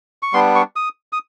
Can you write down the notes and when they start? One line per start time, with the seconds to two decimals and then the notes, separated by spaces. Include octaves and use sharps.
0.23 C#6
0.33 G3 B3 D4 C6
0.55 C#6
0.76 D#6
1.13 D#6